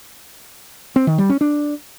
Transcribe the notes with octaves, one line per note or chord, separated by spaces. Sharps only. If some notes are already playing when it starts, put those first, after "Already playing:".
C4
D#3
G3
C#4
D4